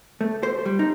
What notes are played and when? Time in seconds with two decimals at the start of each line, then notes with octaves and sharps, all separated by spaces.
0.21 A3
0.43 C5
0.65 G3
0.79 D#4